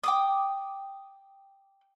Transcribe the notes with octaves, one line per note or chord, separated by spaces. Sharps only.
G5 D6 D#6